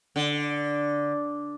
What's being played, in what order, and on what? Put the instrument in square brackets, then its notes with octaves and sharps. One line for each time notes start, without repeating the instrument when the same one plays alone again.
[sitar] D3